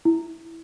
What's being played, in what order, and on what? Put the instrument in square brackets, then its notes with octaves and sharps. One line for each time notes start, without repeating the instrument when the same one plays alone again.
[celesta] E4